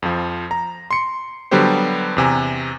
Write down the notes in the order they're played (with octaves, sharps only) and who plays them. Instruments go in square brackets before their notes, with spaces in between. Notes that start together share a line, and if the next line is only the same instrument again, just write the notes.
[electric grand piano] F2 F3
A#5
C6 C#7
D3 F#3 G3 B3 G4 C5
E2 C3 G#5 A#5